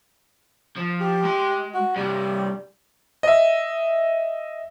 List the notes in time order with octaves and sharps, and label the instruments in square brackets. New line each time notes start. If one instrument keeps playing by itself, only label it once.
[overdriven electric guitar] F3
[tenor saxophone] G4
[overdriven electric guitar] G#3 C6
[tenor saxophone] F#4
[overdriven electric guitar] G2 C3 [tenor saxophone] G3
[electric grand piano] D#5 E5